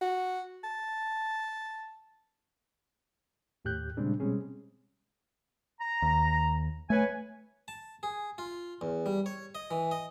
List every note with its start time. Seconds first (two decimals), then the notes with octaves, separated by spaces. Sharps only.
0.01 F#4
0.64 A5
3.65 D#2 A2 G4 F#6 G6
3.97 A#2 C#3 G3 G#3 C4 D4
4.20 B2 G3 G#3 C4 C#4 G#4
5.80 A#5
6.02 D#2
6.90 A3 B4 C#5 G#5
7.68 A5
8.03 G#4
8.38 F4
8.81 E2
9.06 G3
9.26 C#5
9.55 D#5
9.71 E3
9.91 D#5